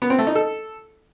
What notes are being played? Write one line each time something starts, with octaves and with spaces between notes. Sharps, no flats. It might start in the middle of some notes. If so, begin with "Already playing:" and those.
B3
C4
A3
D#4
A4